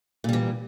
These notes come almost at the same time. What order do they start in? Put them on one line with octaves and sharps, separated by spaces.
A#2 G3 E3